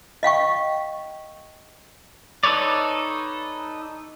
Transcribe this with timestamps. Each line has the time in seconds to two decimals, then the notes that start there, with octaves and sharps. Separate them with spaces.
0.23 D#5 F5 G5 C#6
2.43 D#4 A4 B4 C#5 D5